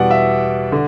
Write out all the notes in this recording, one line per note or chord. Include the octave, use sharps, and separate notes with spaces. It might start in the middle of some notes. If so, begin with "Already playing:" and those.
Already playing: E2 B2 G3 D5 F#5
E5
D3